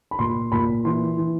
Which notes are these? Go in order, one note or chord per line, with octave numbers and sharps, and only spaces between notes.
B5
A#2 C6
A#2 B5
E3 C6
E3